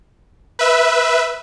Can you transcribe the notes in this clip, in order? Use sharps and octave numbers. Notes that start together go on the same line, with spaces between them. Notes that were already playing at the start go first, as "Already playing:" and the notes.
B4 E5